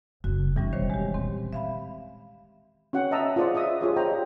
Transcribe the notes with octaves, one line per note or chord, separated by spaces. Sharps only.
F#1 F#4
D#1 E3 G3 C#4 D#4
E1 D#3 C5 C#5
G#3 G4
A#2 C4
E5 F5 B5
C#4 F#4 F#5 G5
D#5 E5 A5 A#5 D#6 E6
F4 G#4 C5 D5 F#5 D#6
D#5 E5 D#6
F4 G4 G#4 C#5 D5 D#6
C5 D5 D#5 G5 A#5